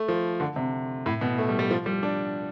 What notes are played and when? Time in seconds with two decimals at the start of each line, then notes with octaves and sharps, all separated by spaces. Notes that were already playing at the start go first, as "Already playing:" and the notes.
Already playing: A3
0.08 F3
0.40 D3
0.56 C3
1.06 A2
1.21 B2
1.38 A3
1.49 G3
1.59 G3
1.71 F3
1.86 G3
2.03 D4